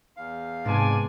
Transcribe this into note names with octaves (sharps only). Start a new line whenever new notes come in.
E2 F5
G#2 C3 G#3 B3 D5 G#5 A5